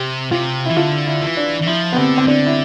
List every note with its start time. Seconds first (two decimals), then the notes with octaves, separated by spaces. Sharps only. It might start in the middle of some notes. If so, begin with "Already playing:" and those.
Already playing: C3 G4
0.31 C3 F4
0.66 E3 E4
0.77 D3 F4
1.06 E4
1.21 E3
1.37 D4
1.61 E3
1.67 F3 E4
1.92 B3
1.97 D3 C4
2.18 C4
2.28 D3 D4
2.46 E4